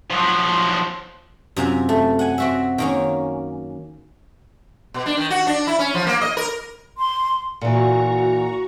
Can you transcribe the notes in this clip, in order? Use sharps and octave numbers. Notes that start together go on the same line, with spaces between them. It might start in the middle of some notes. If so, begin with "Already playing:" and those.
F3 F#3
F#2 C3 F4 G#5
A3
F#5 G#5
C4 F#4 E5
D#3 A#3 C#4
B2
D4
D#3
F#4
D4
E4
C#4
F3
A#3
D#5
A#4
C6
A#2 E3 F#4 A#5 C#6